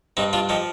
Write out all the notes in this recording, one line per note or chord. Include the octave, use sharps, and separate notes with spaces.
G2 C4 D#4
D4 F4
F3 D#4 G4